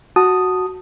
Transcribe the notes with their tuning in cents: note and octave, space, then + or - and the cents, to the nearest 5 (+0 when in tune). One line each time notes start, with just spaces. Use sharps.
F#4 +0 A5 +5 D#6 -5